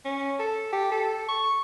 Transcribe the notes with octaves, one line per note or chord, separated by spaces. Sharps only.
C#4
A4
G4
A4
C#6